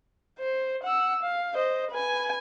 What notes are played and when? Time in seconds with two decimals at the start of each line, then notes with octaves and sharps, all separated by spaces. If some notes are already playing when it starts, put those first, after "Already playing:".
0.39 C5
0.83 F#5 E6
1.23 F5
1.54 C5 D#5
1.90 B4 G#5